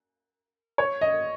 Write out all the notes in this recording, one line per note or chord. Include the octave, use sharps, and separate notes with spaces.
C#5
D#5